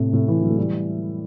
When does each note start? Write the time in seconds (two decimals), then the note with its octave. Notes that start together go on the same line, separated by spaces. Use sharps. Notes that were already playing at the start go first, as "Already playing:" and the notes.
Already playing: A2 C3
0.13 A2 C3
0.28 C3 E3
0.42 D3 F#3
0.50 A3
0.57 E3 G3